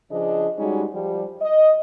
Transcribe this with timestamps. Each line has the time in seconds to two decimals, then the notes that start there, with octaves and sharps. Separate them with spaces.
0.11 C#3 F3 D4 G#4 D#5
0.59 G3 G#3 C#4 D#4 F#4
0.94 F3 G3
1.42 D#5